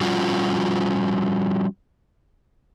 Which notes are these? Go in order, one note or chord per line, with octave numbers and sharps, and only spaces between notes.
F3 G3 C#4 F4 F#4